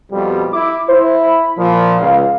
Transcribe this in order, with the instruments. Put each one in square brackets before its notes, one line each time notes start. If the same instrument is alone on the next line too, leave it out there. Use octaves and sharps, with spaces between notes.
[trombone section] F2 B2 G3
[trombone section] E4 [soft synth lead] D6
[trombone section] E4 [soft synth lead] C5
[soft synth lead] B5
[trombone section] A#2 F3
[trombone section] C#2 [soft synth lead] F5